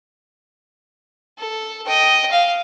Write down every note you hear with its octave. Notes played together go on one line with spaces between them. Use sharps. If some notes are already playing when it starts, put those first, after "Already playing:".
A4
D#5 G5
F5